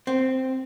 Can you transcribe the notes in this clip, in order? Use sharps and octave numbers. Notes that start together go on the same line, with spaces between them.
C4